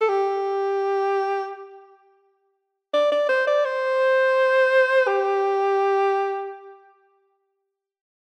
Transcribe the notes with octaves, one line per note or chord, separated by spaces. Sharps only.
A4
G4
D5
D5
C5
D5
C5
G4